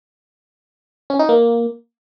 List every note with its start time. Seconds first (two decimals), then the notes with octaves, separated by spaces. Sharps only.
1.10 C#4
1.19 D#4
1.29 A#3